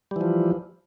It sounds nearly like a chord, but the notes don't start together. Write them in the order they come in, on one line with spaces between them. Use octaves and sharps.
G3 E3 F3